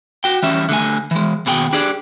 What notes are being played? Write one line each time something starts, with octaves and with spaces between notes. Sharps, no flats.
F#4 G5
E3 G3 C#4 E5
D3 A3 G#5
E3 G#3
D#2 B2 G#4 G5
D4 G4 G#4 D5